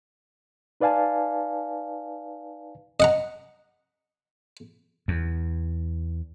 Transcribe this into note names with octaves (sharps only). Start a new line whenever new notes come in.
D#4 B4 D5 F5 G#5 A5
D#5 F#5 A#5
E2